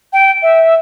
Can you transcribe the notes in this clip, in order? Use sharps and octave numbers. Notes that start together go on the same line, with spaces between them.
G5
E5